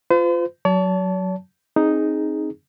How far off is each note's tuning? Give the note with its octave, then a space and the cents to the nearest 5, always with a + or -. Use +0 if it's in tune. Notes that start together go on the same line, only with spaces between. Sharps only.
F4 -5 C5 -45
F#3 +0 C#5 +45 A5 +0
C4 +25 D#4 +0 G#4 +0